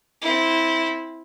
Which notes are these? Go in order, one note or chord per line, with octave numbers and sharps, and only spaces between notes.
C4 E4